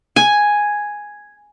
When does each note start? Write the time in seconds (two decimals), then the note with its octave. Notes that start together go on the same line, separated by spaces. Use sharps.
0.16 G#5